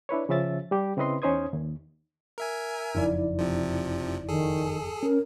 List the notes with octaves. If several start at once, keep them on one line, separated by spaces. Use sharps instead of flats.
D4 E4 B4 C#5
C#3 F3 C#4 E5 A6
G3 G4
C#3 C4 E4 B4 D#5 C6
E2 C#4 D#4 C5 D#6 G#6
D#2
A#4 E5 G#5
F#1 F2 D#4 E4 D5
C3 F3
D#3 G#4 A4
C#4 A#4